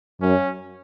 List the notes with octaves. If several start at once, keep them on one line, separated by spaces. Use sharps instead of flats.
F#2 C#4